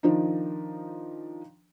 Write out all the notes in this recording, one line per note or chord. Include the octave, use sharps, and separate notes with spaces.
D#3 F3 D4 D#4